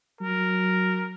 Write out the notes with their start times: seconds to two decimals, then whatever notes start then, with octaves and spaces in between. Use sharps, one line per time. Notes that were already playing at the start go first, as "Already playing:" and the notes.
0.21 F#3 A#4